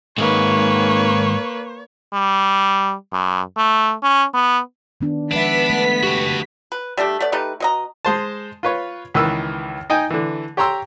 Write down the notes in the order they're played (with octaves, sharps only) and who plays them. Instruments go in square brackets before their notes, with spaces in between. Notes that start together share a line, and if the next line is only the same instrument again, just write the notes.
[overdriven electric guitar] G#2 D#3 [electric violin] A#3 B4 [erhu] C#5
[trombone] G3
F#2
A3
C#4
B3
[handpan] D#3 B3 D4
[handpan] F3 G#3 E5 [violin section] B3 B6 [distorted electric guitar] D4
[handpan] A3
[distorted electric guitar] F#4 A5 [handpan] G4
[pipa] B4
G3 A3 D4 G4
A3 B3 D5
A3 D#4 G4 B4
B2 D#5 A#5
[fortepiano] G#3 C5 A5
F4 B4 C#5
C#2 D#3 E3 B4 E6
D#4 D#5 G5 G#5
D3 E3
G4 C#5 G5 A#5 C6 E6